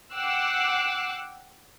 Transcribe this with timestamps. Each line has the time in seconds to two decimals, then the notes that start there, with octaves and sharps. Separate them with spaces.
0.14 F#5 G5 D6 E6 F#6 C7